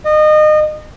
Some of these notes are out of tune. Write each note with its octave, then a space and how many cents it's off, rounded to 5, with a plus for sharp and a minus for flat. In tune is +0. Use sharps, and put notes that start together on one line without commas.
D#5 -30